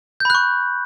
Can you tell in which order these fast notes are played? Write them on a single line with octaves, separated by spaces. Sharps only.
G6 B5 F#6 C#6